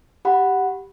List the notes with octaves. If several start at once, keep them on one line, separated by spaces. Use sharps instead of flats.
G4 F#5 B5